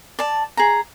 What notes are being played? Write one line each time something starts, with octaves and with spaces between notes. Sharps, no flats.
D5 A5
G#4 A#5